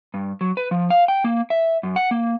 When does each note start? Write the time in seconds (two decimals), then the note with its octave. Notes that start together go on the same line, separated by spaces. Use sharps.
0.14 G2
0.41 F#3
0.57 B4
0.71 F3
0.90 F5
1.08 G5
1.24 A#3
1.50 E5
1.83 F#2
1.96 F#5
2.11 A#3